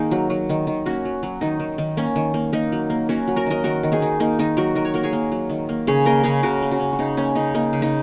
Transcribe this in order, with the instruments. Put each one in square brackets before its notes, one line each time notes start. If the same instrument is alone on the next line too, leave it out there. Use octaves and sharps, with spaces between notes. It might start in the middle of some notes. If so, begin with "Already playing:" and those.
Already playing: [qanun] D#3 A#3 D#4 G#4
F#3
F#3
D#3
D#3
A#3 C#4 F#4
F#3
F#3
D#3 D#4
D#3
D#3
A#3 C#4
D#3
A#3
A#3 D#4
F#3
A#3
A#3 C#4 F#4
F#3
F#4 A#4
D#3 A#4 D#5
D#3 F#4 A#4
D#3
D#4 G#4
D#3
A#3 D#4
D#3 D#4
F#3 F#4 A#4
D#3 A#4
C#5
A#3 F#4 A#4
G#4 C#5
A#3
F#3
D#3
A#3
C#3 G#4 C#5
A#3 A#4 D#5
C#3 G#4 C#5
C#3 F#4 A#4
A#3
C#4 F#4
C#3
F#4
C#3 D#4
A#3 C#4
C#3 D#4
A#3 D#4
C#3
D#4